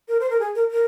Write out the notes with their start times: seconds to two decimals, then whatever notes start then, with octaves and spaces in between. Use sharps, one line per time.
0.08 A#4
0.20 C5
0.30 A#4
0.40 G#4
0.55 A#4
0.71 A#4